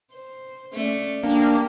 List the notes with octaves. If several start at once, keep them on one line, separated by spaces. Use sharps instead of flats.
C5
A3 C#4 D5
A#3 D4 G4